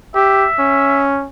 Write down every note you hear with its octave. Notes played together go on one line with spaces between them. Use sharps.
G4 E5
C#4